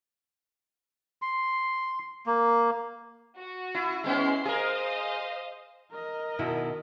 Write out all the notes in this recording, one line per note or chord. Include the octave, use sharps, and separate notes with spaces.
C6
A#3
F#4
E4
G#3 B3 C#4 E4 C6 C7
G#4 A#4 C5 D#5 F5
A#4 D#5
B2 D#3 E4